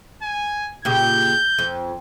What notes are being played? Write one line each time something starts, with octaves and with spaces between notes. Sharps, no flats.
G#5
A#2 C#3 G4 G6
F2